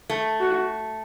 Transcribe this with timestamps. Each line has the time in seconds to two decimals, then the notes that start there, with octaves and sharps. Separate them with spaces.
0.10 A3
0.40 F#4